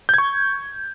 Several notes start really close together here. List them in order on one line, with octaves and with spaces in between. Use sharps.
G6 G#6 C#6